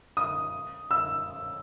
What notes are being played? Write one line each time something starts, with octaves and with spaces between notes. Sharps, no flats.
D#6
E6